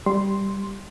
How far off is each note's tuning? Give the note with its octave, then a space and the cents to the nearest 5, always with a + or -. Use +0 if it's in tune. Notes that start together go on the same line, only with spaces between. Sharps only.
G3 +0 C6 +0